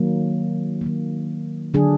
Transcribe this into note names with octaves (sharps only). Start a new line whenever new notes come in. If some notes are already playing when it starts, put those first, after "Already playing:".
Already playing: D#3 F#3 A#3
D#3 F#3 A#3
D3 F#3 D4 G#4